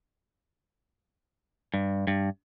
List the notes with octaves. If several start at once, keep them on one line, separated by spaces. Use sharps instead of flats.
G2
G2